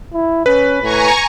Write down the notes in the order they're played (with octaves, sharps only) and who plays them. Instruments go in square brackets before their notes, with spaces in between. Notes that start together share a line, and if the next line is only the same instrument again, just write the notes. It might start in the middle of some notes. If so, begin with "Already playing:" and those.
[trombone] E4
[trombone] C#4 [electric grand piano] B4
[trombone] A2 [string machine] G#5 A#5 C#6